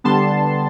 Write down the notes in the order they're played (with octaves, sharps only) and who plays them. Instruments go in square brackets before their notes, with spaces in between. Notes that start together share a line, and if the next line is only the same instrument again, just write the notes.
[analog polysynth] D3 G3 B3 A5 C6